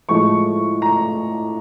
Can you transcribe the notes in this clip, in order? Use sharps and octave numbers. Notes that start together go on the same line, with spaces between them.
A2 F3 G#3 C#6
A#5